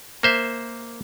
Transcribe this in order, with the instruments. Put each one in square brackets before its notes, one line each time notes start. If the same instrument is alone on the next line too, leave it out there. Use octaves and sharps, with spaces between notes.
[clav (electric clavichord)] A#3 C5 E5